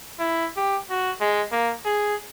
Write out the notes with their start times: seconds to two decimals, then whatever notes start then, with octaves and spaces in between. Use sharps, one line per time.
0.19 E4
0.57 G4
0.90 F#4
1.20 G#3
1.52 A#3
1.85 G#4